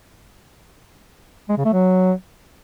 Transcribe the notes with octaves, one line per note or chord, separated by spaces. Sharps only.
G#3
C#3
A3
F#3